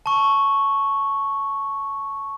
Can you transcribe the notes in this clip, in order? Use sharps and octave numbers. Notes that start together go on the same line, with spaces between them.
A5 C#6